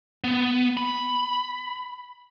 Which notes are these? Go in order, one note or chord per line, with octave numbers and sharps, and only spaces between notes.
B3
B5